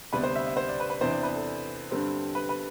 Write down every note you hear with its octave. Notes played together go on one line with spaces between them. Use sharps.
D2 C3 G3 B3 D4 B4
C5
E5
E5
C5
D5
B4
B4
E2 C3 E3 B3 D4 C5
D5
B4
A4
G2 D3 G3 C4
B4
B4